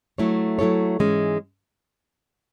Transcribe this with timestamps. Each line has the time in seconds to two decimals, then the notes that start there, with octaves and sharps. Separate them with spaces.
0.18 F#3 A3 E4 A4 C#5
0.59 F#3 A3 E4 A4 C#5
0.99 G#2 E3 G#3 C#4